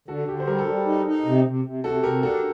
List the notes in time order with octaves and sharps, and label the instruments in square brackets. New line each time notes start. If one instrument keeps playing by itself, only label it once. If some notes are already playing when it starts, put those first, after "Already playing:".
[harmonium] D3 [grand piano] F#4 A4
[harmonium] D3 [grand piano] G4
[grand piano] C5
[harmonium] G3 [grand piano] G4 A#4
[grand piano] A4
[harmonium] G3 [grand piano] G4
[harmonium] D#4
D#4
C3
C3
C3
[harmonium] C3 [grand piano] F#4 A4
[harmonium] C3 [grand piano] G4 A#4
[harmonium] D4 [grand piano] F#4 A4